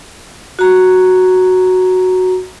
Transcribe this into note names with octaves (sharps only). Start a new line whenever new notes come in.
F#4 A#5